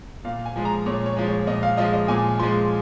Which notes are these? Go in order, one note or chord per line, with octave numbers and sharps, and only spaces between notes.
A#2 F5
G#5
F3 G#3
A#5
A#2 C#5
C#5
F3 G#3
C#5
A#2 D#5
F5
F3 G#3 D#5
D#5
A#2 G#5
F3 G#3 C6